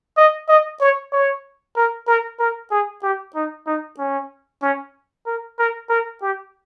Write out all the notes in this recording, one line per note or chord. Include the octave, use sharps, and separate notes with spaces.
D#5
D#5
C#5
C#5
A#4
A#4
A#4
G#4
G4
D#4
D#4
C#4
C#4
A#4
A#4
A#4
G4